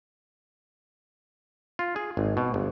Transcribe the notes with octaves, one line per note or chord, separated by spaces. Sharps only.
F4
G#4
G#1
B2
G1